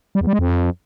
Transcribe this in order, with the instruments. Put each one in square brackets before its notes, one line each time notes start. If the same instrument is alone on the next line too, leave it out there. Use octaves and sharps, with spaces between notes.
[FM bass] G3
E2
G3
G#3
F2